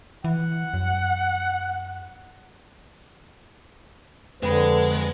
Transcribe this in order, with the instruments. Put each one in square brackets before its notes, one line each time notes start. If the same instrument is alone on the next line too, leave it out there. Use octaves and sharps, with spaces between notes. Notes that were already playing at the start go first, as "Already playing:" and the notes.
[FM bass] E3 [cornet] F#5
[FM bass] F#2
[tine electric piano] F2 C4 B5 [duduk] D3 [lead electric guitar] G#3 [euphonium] B4